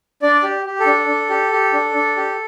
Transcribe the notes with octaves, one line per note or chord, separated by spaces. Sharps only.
D4 D5
G4
G4
A4
D4
D4
G4
G4
D4
D4
G4